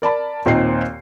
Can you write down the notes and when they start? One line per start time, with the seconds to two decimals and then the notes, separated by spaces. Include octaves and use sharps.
0.02 A#4 D5 A5 B5
0.46 D#2 A#2 C4 D#4 C5 C7